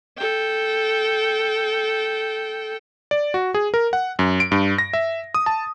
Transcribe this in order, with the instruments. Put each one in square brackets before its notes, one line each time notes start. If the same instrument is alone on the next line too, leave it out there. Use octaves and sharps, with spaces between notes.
[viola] A4 G5
[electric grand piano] D5
F#4
G#4
A#4
F#5
F#2
D7
G2
A#6
E5
D#6
A5